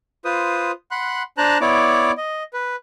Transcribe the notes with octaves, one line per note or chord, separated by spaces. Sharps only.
F4 B4 C5 D#6
F#5 B5 C6 F#6
D4 C5 A5 A#5 F#6
B3 E4 C#5 D5 D6
D#5
B4